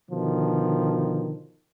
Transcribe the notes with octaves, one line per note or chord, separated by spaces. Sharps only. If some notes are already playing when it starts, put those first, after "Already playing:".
B2 D3 D#3 F3